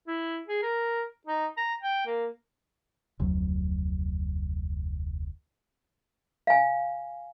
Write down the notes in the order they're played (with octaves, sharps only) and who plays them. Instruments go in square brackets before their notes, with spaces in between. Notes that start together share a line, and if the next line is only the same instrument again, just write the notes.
[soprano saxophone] E4
G#4
A#4
D#4
A#5
G5
A#3
[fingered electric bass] F1 D2 F#3
[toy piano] F5 G#5